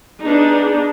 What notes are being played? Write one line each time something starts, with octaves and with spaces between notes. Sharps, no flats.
B3 D4 D#4 G#4